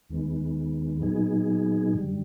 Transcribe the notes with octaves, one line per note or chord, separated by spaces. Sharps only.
D#2 D#3 G#3 B3
A#2 F#3 B3 D#4 G#4
F#2 D3 G3